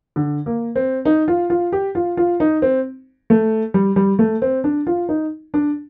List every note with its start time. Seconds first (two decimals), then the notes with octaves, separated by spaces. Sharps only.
0.16 D3
0.46 A#3
0.76 C4
1.05 D#4
1.28 F4
1.50 F4
1.72 G4
1.95 F4
2.17 F4
2.40 D#4
2.62 C4
3.30 A3
3.74 G3
3.96 G3
4.19 A3
4.42 C4
4.64 D4
4.87 F4
5.09 D#4
5.54 D4